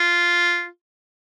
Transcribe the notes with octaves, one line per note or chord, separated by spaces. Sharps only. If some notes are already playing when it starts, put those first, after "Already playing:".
Already playing: F4